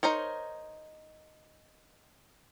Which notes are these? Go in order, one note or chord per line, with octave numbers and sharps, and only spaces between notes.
D#4 A#4 C5 C#5